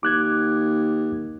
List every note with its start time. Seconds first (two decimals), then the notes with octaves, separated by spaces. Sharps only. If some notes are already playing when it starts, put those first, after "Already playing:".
0.03 D#2 D6 F#6 G#6